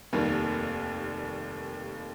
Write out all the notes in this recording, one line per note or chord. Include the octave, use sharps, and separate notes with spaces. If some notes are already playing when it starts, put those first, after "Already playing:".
F1 D#2 D#3 G3 A#3